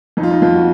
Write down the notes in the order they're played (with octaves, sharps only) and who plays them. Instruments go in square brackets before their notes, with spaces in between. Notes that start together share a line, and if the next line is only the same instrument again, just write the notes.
[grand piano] F2 D#4
F4
D#4
F2 F4
F#4